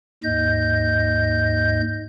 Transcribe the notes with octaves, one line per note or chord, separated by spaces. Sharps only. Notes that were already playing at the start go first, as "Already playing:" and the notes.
D#2 G#2 D#5 G6